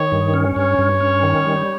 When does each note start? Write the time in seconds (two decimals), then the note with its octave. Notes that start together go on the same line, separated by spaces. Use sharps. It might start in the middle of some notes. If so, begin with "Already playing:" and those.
Already playing: D#3 C#5
0.12 G2
0.34 C#4
0.56 G2 C#5
0.79 G2
1.01 C#4
1.23 D#3
1.46 G3